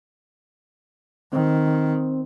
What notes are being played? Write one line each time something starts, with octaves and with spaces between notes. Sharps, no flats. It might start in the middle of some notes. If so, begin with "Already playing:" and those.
D#3 C4